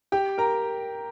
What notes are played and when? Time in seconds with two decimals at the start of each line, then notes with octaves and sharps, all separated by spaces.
0.12 G4 G5
0.38 A#4 A#5